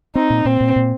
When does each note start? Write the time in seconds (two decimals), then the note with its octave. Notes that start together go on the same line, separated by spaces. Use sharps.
0.15 C4 D#4
0.30 A#2
0.45 A#2 C4
0.61 A#2
0.76 A#2